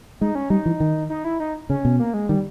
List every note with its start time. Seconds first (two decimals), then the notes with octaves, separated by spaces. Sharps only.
0.21 G#3 D#4
0.35 C#4
0.50 G3 D#4
0.66 E3
0.80 D#3
1.10 D#4
1.24 E4
1.40 D#4
1.69 C#3 C#4
1.85 B2
1.99 A#3
2.14 G#3
2.29 D#3 G3